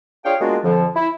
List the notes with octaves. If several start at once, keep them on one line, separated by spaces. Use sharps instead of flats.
D4 F4 G#4 C#5 F5 G5
G#3 A#3 B3 D4 F4 F#4
F2 D3 F3
E4